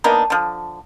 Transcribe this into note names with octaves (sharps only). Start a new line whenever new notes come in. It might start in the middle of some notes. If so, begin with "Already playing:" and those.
A#3 B3 D4 D#4
D3 F3